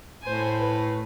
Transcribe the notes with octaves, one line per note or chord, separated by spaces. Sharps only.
A2 C5 G#5
B4